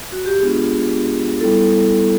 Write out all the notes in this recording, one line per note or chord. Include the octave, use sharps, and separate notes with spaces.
F#4
G4
G#3 B3 D4 F4 G#4
G3 B3 E4 A4